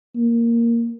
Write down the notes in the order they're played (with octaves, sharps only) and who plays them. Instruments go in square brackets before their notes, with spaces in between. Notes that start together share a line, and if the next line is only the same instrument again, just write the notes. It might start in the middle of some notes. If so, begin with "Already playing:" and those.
[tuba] A#3